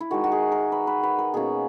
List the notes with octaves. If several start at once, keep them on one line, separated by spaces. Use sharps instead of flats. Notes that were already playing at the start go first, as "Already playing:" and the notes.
E4
D#3 G#3 D#4 F#4
F#4
G#4
A#4
B4
B4
B4
A#4
B2 A#3 C#4 G#4